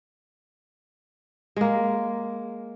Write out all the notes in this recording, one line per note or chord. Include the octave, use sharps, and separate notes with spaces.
G#3 A#3